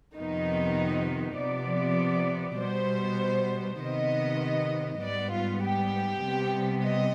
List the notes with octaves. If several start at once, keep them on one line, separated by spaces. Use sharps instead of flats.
F2 C3 D#3 B3 D#4
C3 F3 B3 D5
B2 G3 B3 C5
C3 D#3 B3 D#5
G#2 G3 B3 D5
F4
G4
C3 G3 B3
D#5